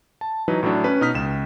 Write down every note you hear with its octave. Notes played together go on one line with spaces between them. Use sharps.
A5
E3 F#3 D#4 B4
A2 F#3 D4
C#4 B4
B2 D#4 D#6 F6 B6
C#2 E7